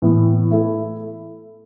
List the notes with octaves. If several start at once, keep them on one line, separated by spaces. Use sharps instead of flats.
A2 E3 B3
A3 E4 A4